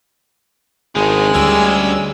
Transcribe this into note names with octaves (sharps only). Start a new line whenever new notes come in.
G#1 D3 G#3 D#4
D2 G3 C#4 D5 E6